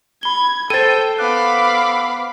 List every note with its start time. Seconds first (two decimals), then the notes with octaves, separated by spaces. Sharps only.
0.23 B5 G#6 G7
0.70 A4 C5 G5 A6 D#7
1.19 B3 F5 B5 D6 F#6